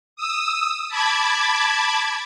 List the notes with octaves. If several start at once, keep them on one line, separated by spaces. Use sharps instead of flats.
D#6 E6
A5 B5 D6 G#6